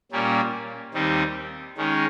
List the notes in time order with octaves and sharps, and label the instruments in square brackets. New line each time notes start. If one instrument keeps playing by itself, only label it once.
[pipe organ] A#2 G3 A#3 C#4
D#2 D#3 G3 C4 D#4
D#3 G#3 C#4